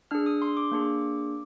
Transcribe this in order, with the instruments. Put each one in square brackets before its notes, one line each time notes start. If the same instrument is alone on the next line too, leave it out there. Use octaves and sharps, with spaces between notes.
[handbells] D4 G#4 F6
D#6
C6
D6
A#3 D4 G#4